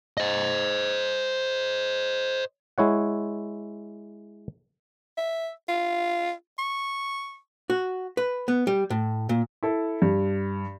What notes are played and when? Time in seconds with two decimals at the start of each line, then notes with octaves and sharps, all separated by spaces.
0.17 C5 D#5
2.78 G#3 E4 C#5 F#5
5.17 E5
5.69 F4
6.58 C#6
7.70 F#4
8.17 B4
8.48 B3
8.67 G3
8.90 A2
9.29 A#2
9.63 E4 A4
10.02 G2